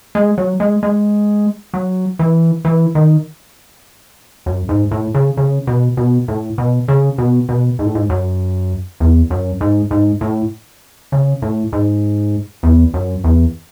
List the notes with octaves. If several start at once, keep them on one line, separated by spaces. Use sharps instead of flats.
G#3
F#3
G#3
G#3
F#3
E3
E3
D#3
F#2
G#2
A2
C#3
C#3
B2
B2
A2
B2
C#3
B2
B2
G#2
A2
G#2
F#2
E2
F#2
G#2
G#2
A2
C#3
A2
G#2
E2
F#2
E2